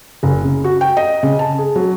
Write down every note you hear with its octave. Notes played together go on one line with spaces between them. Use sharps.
F#1
C#3
F#4
G5
D#5
C#3
A5
G#4
F#3